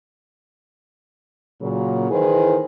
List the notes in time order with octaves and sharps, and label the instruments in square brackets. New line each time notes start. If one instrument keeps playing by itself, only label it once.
[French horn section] A#2 C#3 F#3
D#3 E3 E4 G#4 B4 C5